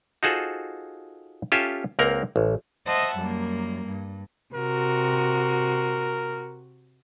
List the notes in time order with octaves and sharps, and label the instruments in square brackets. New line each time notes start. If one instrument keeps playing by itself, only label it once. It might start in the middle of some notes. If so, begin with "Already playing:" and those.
[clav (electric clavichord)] D#4 F4 F#4 G#4 A4 C5
C#4 F4 G4 A4 E5 G#5
C#2 A#3 C4 A#4 F#5 A#5
A1
[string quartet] C5 D#5 E5 F#5 A5
F#2 G3 A#3
G2
[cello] C3 F#4 [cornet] A#4